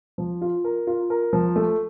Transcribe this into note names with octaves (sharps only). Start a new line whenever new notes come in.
F3
F4
A#4
F4
A#4
F3
A3